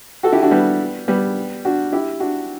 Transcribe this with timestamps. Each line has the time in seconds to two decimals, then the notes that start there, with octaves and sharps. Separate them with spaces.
0.23 F#4 A4
0.32 E4 G4
0.42 D4 F#4
0.51 G3 B3
1.08 G3 B3
1.65 D4 F#4
1.92 E4 G4
2.20 D4 F#4